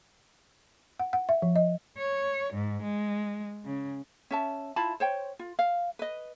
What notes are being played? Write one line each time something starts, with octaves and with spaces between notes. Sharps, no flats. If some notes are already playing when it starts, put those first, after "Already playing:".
F#5
F#5
E5
F3
D#5
C#5
G#2
G#3
C#3
C#4 E5 A5
E4 F4 A5 B5
C5 C#5 G5
F4
F5
B4 D#5